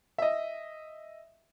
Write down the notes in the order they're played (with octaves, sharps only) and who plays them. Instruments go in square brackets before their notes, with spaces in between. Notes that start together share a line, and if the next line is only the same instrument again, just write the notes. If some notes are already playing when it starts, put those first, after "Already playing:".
[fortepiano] D#5 E5